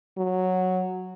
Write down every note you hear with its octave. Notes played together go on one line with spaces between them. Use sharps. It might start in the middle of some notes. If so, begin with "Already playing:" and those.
F#3